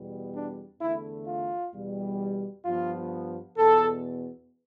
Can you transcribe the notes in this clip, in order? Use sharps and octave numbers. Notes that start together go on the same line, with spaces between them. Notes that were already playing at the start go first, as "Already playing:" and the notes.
Already playing: E2 B2 G3 B3
D4
E2 D3 A3 E4
F4
E2 B2 G3
G2 F3 B3 F4
E2 B2 B3 A4